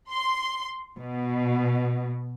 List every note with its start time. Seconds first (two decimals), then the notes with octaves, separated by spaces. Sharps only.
0.10 C6
0.98 B2